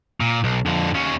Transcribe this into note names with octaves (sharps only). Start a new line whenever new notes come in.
A#2
B1
F2 D3
D#2 C#4